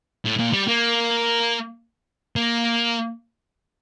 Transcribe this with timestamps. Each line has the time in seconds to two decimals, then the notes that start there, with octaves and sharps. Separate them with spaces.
0.25 A2
0.39 A#2
0.54 G3
0.68 A#3
2.36 A#3